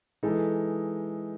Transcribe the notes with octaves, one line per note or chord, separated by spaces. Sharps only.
E3 G#3 D#4 A4